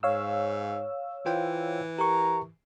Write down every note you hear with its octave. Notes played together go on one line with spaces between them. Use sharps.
G#2 C#5 F5 E6
E3 F4 C5 G5
G4 A#4 A#5 C#6